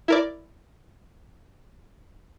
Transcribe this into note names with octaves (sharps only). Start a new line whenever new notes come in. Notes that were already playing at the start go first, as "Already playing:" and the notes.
E4 A#4 D5